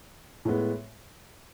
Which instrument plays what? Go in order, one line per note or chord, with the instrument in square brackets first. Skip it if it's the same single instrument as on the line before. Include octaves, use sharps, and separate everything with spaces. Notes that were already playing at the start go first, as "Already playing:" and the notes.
[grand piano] A2 G#3 B3